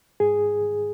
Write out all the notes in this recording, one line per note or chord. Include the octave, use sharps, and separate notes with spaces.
G#2 G#4